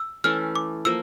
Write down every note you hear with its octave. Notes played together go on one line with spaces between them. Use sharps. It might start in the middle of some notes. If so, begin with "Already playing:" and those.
Already playing: E6
E3 A3 C#4 F6
D6
F3 A#3 E6